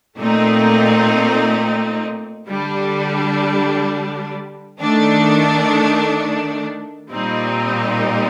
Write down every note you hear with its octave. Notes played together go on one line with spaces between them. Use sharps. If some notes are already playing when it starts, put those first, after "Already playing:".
A#2 A3 C4 D#4
D3 G3 D4
D#3 A3 D4
A#2 G3 C4 D#4